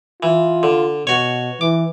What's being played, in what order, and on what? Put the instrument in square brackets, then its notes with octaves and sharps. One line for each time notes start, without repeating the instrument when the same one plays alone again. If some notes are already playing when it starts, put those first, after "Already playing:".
[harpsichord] E3 [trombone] F4
[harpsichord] D3
[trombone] B2 [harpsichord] F#4 C#5
[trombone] E3 [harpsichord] D6